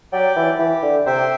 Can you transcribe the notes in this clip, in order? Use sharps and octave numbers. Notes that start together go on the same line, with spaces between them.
F#3 G4 D5 G5
E3
E3 G4
D3
C3 C5 E5 G5